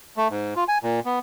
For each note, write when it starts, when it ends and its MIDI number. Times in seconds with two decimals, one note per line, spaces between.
0.17 0.28 57
0.30 0.54 44
0.56 0.64 65
0.68 0.78 80
0.83 1.00 46
1.05 1.19 59